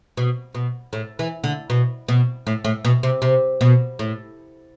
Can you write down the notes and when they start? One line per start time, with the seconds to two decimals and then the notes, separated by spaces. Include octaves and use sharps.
0.17 B2
0.55 B2
0.93 A2
1.19 E3
1.44 D3
1.70 B2
2.08 B2
2.47 A2
2.64 A2
2.85 B2
3.03 C3
3.22 C3
3.61 B2
3.99 A2